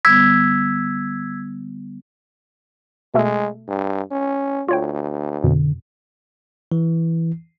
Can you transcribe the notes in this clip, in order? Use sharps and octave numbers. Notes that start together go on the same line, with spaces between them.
D3 G3 B3 E6 G#6 B6
B2 G#3 A3 A4
G2
C#4
D2 F4 C#5 G5
F2 B2 D3
E3